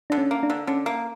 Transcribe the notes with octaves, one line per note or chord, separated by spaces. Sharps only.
D3 D4
C#4
A#3
D4
D3
D3 C#4
A#3